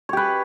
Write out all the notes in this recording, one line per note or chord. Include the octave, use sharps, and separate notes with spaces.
G4 B4 C#5